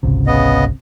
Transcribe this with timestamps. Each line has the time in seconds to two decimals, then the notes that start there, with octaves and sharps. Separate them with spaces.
0.03 G#1 C#2 C3
0.27 C#3 B3 D#5